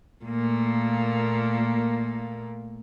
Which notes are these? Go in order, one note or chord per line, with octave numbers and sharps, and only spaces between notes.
A#2 A3 A#3